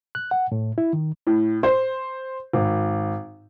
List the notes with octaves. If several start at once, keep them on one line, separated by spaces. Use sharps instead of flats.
F#6
F#5
A2
E4
D#3
A2
C5
G#1